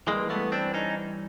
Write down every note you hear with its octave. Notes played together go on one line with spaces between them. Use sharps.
G2 E3 G#3 A#3
A3 B3
C4 D4
C#4 D#4